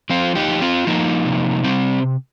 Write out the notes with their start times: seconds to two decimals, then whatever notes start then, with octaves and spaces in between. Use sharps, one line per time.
0.10 F3 C4 F4
0.35 D#4 G4
0.48 F3
0.62 C4 F4
0.87 F3 A#3 D#4
1.26 C3
1.64 G3 C4